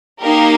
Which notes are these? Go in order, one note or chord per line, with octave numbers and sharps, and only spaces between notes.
A#3 D#4 G4 A#4